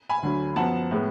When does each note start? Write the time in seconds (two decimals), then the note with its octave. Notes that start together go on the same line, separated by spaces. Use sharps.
0.09 G#5 B5
0.23 D2 D3 F#3
0.56 F#2 F3 B3 F#5 A5
0.91 A2 G#3 B3